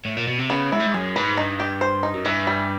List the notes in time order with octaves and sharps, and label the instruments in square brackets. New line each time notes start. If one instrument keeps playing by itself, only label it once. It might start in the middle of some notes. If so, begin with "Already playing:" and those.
[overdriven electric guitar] A2
A#2
B2
C3
[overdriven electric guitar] C#3 [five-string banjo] B3
[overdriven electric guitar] G#2 [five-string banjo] E4
[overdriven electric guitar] A2
G#2
[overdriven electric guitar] F#2 [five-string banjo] G#4
[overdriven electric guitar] G#2 [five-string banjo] B4
[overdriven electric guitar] G2 [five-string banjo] D#4
[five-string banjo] G4
C5
D#4
[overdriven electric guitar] F#2
[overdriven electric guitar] G2 [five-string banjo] E3
[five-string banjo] G3